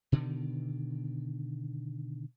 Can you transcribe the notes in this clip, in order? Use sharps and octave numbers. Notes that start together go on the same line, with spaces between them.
B2 D3 D#3